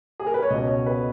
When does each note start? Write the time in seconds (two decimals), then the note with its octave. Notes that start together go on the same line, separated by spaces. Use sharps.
0.20 G#4
0.27 A#4
0.34 B4
0.42 C#5
0.50 C#2 B2 D#5
0.67 C#5
0.86 B4